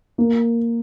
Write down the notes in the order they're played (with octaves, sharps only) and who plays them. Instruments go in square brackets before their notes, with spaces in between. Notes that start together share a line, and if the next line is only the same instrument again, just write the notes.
[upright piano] A#3